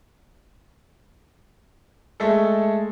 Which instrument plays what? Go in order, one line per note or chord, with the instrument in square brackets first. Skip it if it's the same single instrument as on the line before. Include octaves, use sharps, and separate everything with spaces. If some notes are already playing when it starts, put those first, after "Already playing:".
[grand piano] G#3 A3 A4